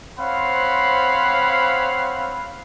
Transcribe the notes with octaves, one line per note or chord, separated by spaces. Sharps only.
C4 C5 C#5 F5 F#5 B5